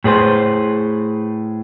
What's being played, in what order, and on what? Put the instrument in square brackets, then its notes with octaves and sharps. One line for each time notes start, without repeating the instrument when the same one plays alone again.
[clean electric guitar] A2 G#4 B4 C5